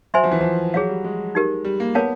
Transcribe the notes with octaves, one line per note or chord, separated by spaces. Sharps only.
F#3 C5 E5 G#5 C6
F3
E3
F3
F#3 G#4 C#5 F5
G3
G#3
D#4 G4 A#4
G3
A#3
B3 A#4 C#5 F5 A5